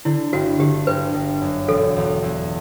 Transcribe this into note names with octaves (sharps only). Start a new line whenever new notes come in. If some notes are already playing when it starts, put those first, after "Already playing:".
D3 E4
G1 F#4
D3 G4
G1 B4
G1
F#2
E1 A4
E2
E2